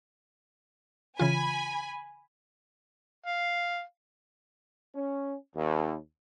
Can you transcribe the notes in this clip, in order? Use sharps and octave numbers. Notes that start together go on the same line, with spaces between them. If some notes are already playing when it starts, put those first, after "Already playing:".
C#3 E3 F4 G#5 B5
F5
C#4
D#2